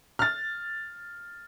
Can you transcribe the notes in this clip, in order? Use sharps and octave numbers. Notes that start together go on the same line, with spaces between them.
F6 A6